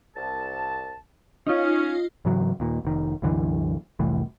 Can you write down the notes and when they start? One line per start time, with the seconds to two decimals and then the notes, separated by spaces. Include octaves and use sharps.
0.16 C2 A5
1.47 C#4 D#4 F4
2.25 G#2 C#3 E3 F#3
2.60 D#2 A#2
2.85 F1 D#3
3.22 C2 F#2 D3 E3
3.99 F1 C2 A2 E3